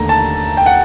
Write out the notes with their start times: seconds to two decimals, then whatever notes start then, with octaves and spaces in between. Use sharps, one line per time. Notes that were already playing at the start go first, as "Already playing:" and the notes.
Already playing: D#2 D3 A3 A#5
0.09 A5
0.57 G5
0.66 F#5